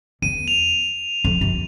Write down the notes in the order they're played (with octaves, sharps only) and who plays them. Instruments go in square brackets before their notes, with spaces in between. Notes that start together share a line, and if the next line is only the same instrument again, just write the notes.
[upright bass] E2 [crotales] D#7
[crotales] F7
[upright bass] F2
F#2